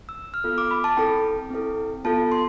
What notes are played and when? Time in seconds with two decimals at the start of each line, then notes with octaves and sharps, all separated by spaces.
0.09 E6
0.34 F6
0.44 B3 F4 A4 E6
0.58 D6
0.71 B5
0.84 A5
0.97 C4 E4 A4 G5
1.51 C4 E4 A4
2.04 B3 F4 A4 A5
2.32 C6